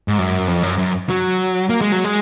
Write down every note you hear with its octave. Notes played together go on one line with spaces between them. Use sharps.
G#2
F#2
F2
F#2
F#2
F#3
A#3
G#3
F#3
G#3